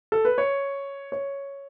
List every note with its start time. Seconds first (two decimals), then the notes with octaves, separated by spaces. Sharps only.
0.12 A4
0.25 B4
0.38 C#5
1.12 C#5